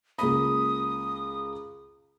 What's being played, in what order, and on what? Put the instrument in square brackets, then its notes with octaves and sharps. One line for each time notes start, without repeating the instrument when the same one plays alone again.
[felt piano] C#2 A#3 B5 [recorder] D#6